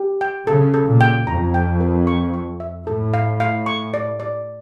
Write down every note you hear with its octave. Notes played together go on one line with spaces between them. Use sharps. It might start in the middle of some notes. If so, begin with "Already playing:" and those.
Already playing: G4
G5
C#3 A4
A4
A#2
G5
F2 A#5
G5
A#4
C#6
C#6
E5
A2 A4
F5
F5
C#6
D5
D5